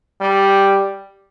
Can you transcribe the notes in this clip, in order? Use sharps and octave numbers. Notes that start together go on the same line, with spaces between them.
G3